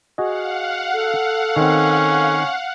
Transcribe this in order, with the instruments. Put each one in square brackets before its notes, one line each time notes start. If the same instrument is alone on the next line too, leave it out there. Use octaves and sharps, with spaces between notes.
[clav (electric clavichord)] F#4 G#4 D#5 [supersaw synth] F5 F#5
[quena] A4
[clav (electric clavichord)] D#3 C4 [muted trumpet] C#4